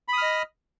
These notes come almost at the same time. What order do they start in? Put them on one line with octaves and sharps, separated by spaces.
B5 D#6 F6 D#5